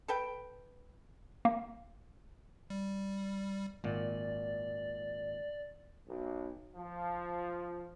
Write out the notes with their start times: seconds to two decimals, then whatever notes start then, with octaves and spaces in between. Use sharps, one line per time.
0.08 A4 B4 G5
1.45 A#3
2.70 G3
3.84 G#1 A#2 D5
6.08 B1
6.76 F3